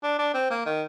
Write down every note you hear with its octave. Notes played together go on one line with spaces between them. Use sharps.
D4
D4
C4
A#3
D#3